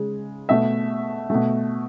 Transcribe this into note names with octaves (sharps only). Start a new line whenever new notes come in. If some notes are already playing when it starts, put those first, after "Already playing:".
Already playing: C#3 G#3
B2 A3 E5
B2 A3